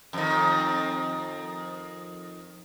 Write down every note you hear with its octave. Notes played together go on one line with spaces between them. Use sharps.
F2 D#3